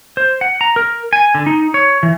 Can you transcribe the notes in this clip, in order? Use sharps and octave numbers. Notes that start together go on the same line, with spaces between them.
C5
F#5
A#5
A#4
G#5
D3
D#4
C#5
E3